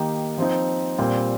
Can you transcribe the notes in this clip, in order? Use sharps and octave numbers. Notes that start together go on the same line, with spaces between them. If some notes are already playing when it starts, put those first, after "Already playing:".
Already playing: D#3 A#3 D#4 G4
F3 C4 D#4
A#2 G3 C4 F4